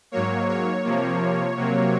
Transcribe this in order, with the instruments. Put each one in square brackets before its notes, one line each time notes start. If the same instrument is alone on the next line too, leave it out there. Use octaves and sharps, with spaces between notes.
[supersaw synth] G#2 F#3 A#3 C#5
C#5
C3 F3 A#3
C3 F#3 A#3